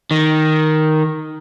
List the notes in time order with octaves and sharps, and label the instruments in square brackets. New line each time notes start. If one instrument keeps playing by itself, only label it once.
[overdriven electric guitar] D#3